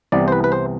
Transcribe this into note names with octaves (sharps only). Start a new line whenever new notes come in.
C2 C3 E3 B3 D5
C5
B4
B4
C5